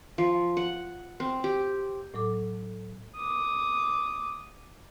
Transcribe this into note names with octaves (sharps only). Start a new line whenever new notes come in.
F3
F#5
C4
G4
A2 F#3 A4 D6
D6 D#6